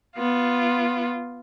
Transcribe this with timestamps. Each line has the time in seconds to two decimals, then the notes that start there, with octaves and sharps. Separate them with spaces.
0.16 B3 F4